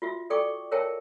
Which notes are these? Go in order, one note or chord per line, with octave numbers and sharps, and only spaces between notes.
F4 F#4 E5
A4 D5 G5 C#6 D6
A#4 C#5 E5 G5 A5